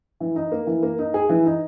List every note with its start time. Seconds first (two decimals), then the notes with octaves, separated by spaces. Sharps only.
0.20 E3
0.36 D#4
0.52 A#3
0.67 E3
0.83 A#3
0.99 D#4
1.14 G#4
1.29 E3
1.46 D#4